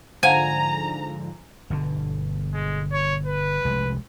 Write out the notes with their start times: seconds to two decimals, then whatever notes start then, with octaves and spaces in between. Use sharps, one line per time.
0.23 G#2 D3 F3 C5 F5 F#5 G#5 A#5
1.70 G1 B2 D3
2.53 G#3
2.92 C#5
3.26 B4
3.65 F1 C2 G#3